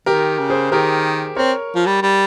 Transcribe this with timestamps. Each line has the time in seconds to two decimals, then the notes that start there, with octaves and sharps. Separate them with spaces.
0.06 D#3 G4 A#4
0.39 C#3
0.50 G#4 C5
0.72 D#3 G4 A#4
1.36 C4 A#4 C#5
1.75 F3
1.86 G3
2.03 G3